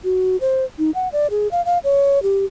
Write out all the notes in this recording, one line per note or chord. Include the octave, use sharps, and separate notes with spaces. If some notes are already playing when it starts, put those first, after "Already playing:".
F#4
C5
D#4
F#5
D5
G#4
F5
F5
C#5
G4